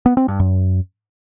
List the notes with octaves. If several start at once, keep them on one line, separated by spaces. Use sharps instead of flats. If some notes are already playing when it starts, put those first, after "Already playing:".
B3
C4
G2
F#2